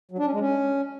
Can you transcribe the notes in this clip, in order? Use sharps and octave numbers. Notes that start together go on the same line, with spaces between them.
F#3
D4
C#4
G#3
C#4